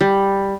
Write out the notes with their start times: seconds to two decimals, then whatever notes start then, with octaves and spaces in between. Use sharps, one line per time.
0.01 G3